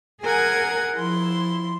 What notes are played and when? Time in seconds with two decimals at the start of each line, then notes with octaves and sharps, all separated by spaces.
0.22 G#4 A#4 F#5 G#5 G#6
0.95 F3 E4 C6